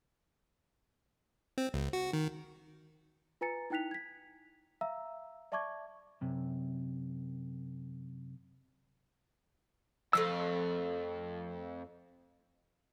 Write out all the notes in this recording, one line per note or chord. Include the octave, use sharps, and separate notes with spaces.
C4
C#2
F#4
D#3
F4 B4 G#5 A#5 A6 C#7
D#4 E4 G5 F#6 B6 F7
G#6 B6
E5 F5 A#5 E6
D5 E5 A5 C#6 D6 G#6
F#2 C3
F2 A3 F5 A5 E6